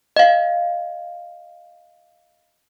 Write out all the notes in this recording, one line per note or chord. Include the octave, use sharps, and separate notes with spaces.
D#5 F5